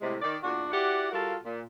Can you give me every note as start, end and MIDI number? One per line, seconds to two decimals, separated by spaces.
0.02 0.15 45
0.02 0.15 48
0.02 0.15 56
0.22 0.36 51
0.22 0.36 74
0.43 0.69 40
0.43 0.69 46
0.43 0.69 62
0.43 0.69 66
0.72 1.07 64
0.72 1.07 66
0.72 1.07 67
0.72 1.07 74
0.72 1.07 78
1.12 1.35 55
1.12 1.35 65
1.12 1.35 66
1.12 1.35 69
1.12 1.35 70
1.12 1.35 77
1.44 1.61 46